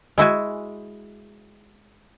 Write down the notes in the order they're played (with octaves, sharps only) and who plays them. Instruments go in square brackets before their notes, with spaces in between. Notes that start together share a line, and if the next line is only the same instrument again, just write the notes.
[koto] G#3 E4 F#4 G#5